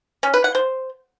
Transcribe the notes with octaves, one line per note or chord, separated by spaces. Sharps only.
C#4
B4
F#5
C5